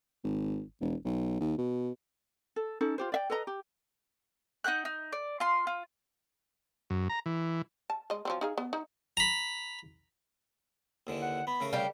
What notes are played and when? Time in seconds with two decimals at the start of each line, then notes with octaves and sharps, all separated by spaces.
0.24 G#1
0.81 E1
1.05 B1
1.40 D#2
1.58 B2
2.56 A4
2.81 C#4 D#4 A4
2.98 F4 G4 C5
3.12 D5 E5 G5
3.30 A4 B4 D#5 A#5
3.47 G4
4.64 D#4 F#5 G5 F#6
4.85 D#4
5.13 D5
5.40 F4 C6
5.67 F4
6.90 F#2
7.10 A#5
7.26 E3
7.90 A5
8.10 G#3 D#5
8.25 F3 F#3 C4
8.41 D#4 G#4 F5
8.58 B3
8.73 D#4
9.17 A#5 B5
11.07 D#2 D3 E3
11.22 F#5
11.47 B3 B5
11.61 C#3 A3 A#4
11.73 G3 G4 F5